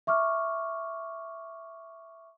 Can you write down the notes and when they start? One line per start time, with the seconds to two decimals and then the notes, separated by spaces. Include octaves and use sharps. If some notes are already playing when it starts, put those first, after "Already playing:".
0.07 E5 C#6 D6 F6